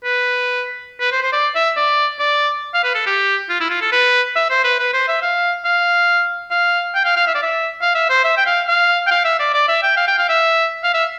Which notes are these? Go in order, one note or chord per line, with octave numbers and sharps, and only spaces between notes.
B4
B4
C5
C5
D5
E5
D5
D5
F5
B4
A4
G4
F4
E4
F4
A4
B4
E5
C5
B4
B4
C5
E5
F5
F5
F5
G5
F5
F5
E5
D5
E5
F5
E5
C5
E5
G5
F5
F5
G5
F5
E5
D5
D5
E5
G5
F5
G5
F5
E5
F5
E5